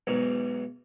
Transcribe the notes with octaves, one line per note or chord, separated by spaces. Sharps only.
B1 E2 G#2